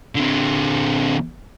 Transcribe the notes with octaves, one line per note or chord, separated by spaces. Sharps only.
D3 C4